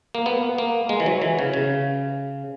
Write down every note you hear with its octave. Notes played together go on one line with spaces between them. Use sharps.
A#3
B3
A#3
G#3
E3
F#3
E3
C#3
C#3